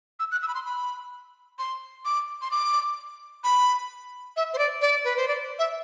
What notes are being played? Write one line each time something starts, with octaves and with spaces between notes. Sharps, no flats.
E6
F#6
E6
B5
C6
B5
C6
D6
C6
D6
B5
E5
C5
D5
D5
B4
C5
D5
E5